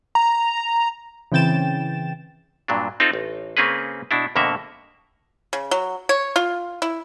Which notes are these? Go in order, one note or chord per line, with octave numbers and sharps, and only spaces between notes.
A#5
C#3 E3 C4 G5 A6 E7
G2 A#2 F#3 D4
C4 D#4 F4 A4
A1
C#3 A#3 C4 C#4 G#4 B4
B2 D4 E4
F2 B2 D3 A#3 F#4 E5
C#3
F#3
C#5
F4
E4